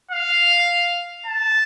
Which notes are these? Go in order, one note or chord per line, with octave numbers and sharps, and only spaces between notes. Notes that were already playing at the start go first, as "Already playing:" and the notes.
F5
A5